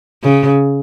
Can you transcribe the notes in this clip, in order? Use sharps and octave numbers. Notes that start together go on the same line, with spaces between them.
C#3